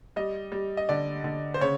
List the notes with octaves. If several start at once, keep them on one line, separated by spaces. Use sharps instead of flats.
G3 D#5
G3
D#5
D3 D5
D3
C5
C#3 C#5